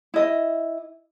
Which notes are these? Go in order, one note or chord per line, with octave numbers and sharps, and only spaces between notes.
E4 D#5